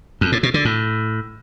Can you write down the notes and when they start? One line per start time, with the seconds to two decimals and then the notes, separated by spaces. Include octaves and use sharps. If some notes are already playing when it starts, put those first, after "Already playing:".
0.21 F2
0.32 A2
0.43 B2
0.54 D3
0.65 A2